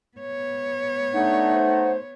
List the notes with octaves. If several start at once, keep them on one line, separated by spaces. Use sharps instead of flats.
B3 C#5
A3 D4 D#4 F#5
C5